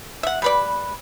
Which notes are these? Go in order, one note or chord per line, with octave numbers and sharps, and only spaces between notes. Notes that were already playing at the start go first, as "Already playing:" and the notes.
E5 F#5
G3 B4 D5